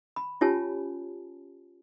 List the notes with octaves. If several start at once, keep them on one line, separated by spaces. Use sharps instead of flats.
B5
C#4 F4 G4 C#5 G#5 A5